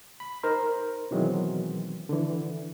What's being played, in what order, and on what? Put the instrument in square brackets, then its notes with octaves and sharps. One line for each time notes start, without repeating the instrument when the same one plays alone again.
[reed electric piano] B5
D#4 A#4 C5
B2 D#3 E3 F#3 G#3 C4
D3 E3